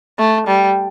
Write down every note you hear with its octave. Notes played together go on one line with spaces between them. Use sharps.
A3
G3